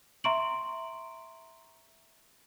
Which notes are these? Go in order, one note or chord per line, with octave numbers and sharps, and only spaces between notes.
E5 A#5 C6 C#6 D7 F#7